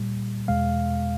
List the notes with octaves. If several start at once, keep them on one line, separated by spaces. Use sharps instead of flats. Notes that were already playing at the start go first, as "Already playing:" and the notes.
Already playing: A#2 G3
E2 B2 G#3 F5